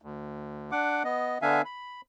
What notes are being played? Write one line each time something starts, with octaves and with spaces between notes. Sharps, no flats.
D2
D4 F#5 D6
B3 D#5
D3 B3 D4 E5 F5 G#5
B5